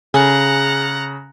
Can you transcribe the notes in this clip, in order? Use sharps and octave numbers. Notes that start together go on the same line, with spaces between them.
C#3 G#4 F#5 A#5